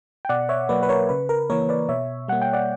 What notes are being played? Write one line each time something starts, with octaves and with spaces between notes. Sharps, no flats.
G5
B2 D5 F#5
C#5 E5
F#3 A#3 B4 D5
B4
A#4 C#5
C#3 B4
A#4
E3 A#3 A#4 C#5
B4 D5
B2 C#5 E5
G3 A#3 F#5
G5
D5 F#5